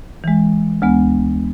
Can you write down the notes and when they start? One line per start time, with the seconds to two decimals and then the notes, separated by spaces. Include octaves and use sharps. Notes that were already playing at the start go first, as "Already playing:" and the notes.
0.24 E3 G#3
0.82 D2 G#3 B3